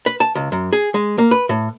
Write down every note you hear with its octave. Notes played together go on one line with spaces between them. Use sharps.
B4
A5
C#2
F#2
G#4
G#3
A#3
B4
A2